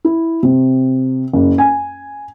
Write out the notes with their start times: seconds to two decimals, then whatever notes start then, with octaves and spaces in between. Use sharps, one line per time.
0.05 E4
0.43 C3
1.33 F#1
1.58 G#5